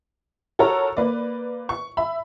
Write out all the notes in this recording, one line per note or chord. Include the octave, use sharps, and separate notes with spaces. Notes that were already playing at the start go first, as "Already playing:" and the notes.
F#4 A4 A#4 C#5 A#5
A#3 B4 D5
C#6
E5 B5